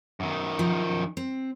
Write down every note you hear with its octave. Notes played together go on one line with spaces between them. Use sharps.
F#2 D#3
F3
C4